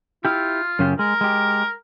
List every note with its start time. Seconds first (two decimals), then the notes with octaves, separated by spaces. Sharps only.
0.25 E4 F4 G4
0.79 F#2 C#3 G4
0.99 G#3 A#4
1.21 G#3 G4